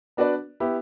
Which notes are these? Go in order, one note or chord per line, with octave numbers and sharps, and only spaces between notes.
B3 D4 F#4 B4 D5
B3 E4 G4